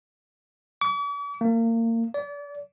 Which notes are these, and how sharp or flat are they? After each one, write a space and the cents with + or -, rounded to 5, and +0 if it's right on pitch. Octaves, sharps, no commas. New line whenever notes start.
D6 -45
A#3 -30
D5 -35